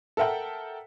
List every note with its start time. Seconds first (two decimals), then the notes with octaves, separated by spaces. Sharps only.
0.17 A4 A#4 E5 F#5 G5